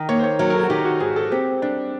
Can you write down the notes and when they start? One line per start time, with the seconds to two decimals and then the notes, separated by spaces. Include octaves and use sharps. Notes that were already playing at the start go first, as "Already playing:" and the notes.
Already playing: D#3
0.09 A#3 C#5
0.19 C5
0.23 C#5
0.39 F#3 A#4
0.50 A#4
0.54 A4
0.63 F#4
0.70 D#3 G4
0.85 F#4
1.00 G#2 G#4
1.16 A4
1.32 C4 G4
1.62 G3 D4